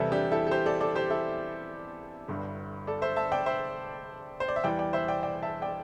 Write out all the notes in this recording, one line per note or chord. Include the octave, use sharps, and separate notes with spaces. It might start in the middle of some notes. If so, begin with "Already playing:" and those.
Already playing: E2 C3 E3 G3 E4 A4
D4 G4
E4 A4
A4
G4 C5
A4 D5
A4 D5
G4 C5
E4 A4
G1 G2 G3
A4 D5
C5 E5
E5 A5
D5 G5
C5 E5
C5
D5
E5
E2 E3 G3 D5 G5
D5 G5
C5 E5
D5 G5
D5 G5
E5 A5
D5 G5